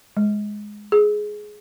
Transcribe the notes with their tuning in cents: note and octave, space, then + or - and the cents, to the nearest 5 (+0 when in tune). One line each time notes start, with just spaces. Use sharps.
G#3 +5
G#4 +15